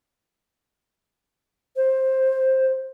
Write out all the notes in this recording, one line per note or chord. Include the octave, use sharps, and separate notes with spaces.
C5